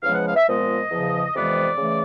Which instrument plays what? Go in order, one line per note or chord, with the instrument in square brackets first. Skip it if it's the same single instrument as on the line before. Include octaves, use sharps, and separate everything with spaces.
[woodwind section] E2 C#3 F3 G#3 B3 F5
F#5
F5
E5
A#2 F3 G#3 B3 D#5
E2 C#3 F3
F2 C3 E3 G#3 B3 D5
C#3 E3 A3